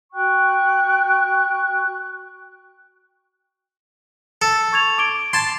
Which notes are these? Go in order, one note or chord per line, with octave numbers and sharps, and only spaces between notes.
F#4 G5 C#6 F#6
A4
C#6 G#6 F7
D6 D7 G7
A5 C6 G#6 A6